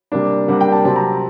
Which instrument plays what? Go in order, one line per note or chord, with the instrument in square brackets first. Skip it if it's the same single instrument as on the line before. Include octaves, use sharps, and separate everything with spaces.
[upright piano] C3 G3 A#3 D4
C3 G3 A#3 D4 F#5
G5
A5
C3 F#3 C4 A5
A#5